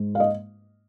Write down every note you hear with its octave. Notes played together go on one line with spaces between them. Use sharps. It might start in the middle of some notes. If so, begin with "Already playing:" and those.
Already playing: G#2 G#3
F5
D#5